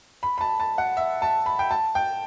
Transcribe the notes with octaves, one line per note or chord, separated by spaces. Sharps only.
B5
B5
A5
A5
F#5
E5
A5
B5
G5
A5
G5